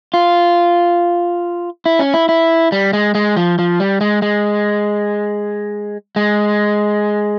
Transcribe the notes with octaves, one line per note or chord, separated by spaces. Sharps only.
F4
E4
C#4
E4
E4
G3
G#3
G#3
F3
F3
G3
G#3
G#3
G#3